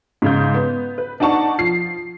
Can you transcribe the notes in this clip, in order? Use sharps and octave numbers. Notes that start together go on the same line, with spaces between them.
G#2 C#3 G6
B3
B4
D4 D#4 F#5 A5 C#6
F3 C7